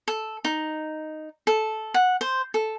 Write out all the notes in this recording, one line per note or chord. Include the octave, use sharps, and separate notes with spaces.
A4
D#4
A4
F#5
C5
A4